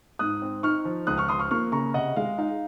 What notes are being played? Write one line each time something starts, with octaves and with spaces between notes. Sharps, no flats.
G#2 D#6 F#6
C4
D#4 C#6 F6
F3
C#2 D#6 F#6
C#6 F6
F3 C6 D#6
C#6 F6
A#3 C#6 F6
C#3 A#5 C#6
C3 D#5 F#5
G#3 F5
D#4 F5